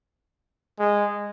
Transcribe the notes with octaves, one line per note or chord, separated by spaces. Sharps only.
G#3